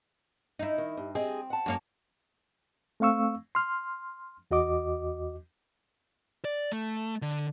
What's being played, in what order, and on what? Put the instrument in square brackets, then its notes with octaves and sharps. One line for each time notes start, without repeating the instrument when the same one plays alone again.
[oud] D#4 E4
[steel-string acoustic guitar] D#3
G2
[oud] C4 [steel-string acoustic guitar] G#4 D#5
[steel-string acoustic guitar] F#5 A5
[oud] F#2 A#3 C#5
[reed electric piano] A3 C4 F5 C#6 E6
C6 F6
E2 F#4 D#5 D6
[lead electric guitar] D5
A3
D3